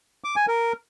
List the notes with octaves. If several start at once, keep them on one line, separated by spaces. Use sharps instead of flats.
D6
G#5
A#4